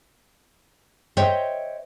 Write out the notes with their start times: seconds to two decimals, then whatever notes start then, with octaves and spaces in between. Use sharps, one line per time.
1.17 C5 C#5 D#5 E5 G5